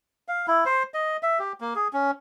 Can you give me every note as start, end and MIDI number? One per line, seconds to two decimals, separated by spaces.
0.28 0.46 77
0.48 0.64 64
0.66 0.83 72
0.94 1.17 75
1.23 1.39 76
1.39 1.53 67
1.61 1.74 58
1.75 1.88 68
1.93 2.11 61